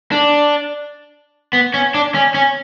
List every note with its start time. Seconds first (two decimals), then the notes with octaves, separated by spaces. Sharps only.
0.12 D4
1.53 B3
1.74 C#4
1.94 D4
2.15 C#4
2.34 C#4